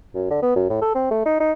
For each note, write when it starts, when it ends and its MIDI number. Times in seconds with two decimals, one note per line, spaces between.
0.15 0.26 42
0.30 0.42 50
0.42 0.55 59
0.56 0.69 42
0.70 0.81 45
0.82 0.90 69
0.95 1.08 60
1.11 1.23 57
1.26 1.38 63
1.40 1.52 63